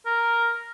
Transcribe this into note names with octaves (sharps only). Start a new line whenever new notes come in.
A#4